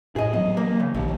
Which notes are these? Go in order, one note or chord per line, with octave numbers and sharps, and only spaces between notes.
A2 G#4 D#5
E3 F#3 B3 D#5
A#3
C#3
A#1 D#2 E3